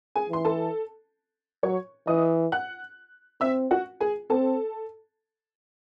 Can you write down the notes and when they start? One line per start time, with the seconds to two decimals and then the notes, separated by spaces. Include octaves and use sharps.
0.16 G#4 G#5
0.30 E3 C6
0.45 A4 A5
1.63 F#3 C#5 C#6
2.07 E3 D#5 D#6
2.52 F#5 F#6
3.41 C4 E5 E6
3.71 F#4 F#5
4.01 G#4 G#5
4.30 C4 A4 A5